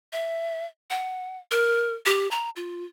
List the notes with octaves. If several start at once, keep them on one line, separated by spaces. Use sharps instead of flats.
E5
F#5
A#4
G4
A#5
F4